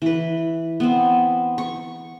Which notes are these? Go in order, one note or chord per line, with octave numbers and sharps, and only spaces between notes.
E3 B4
B3 C4
C#6